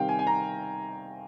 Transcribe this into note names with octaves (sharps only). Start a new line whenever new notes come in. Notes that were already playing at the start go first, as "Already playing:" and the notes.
Already playing: C3 D#3 G3 F5 G5
G#5
G#5
A#5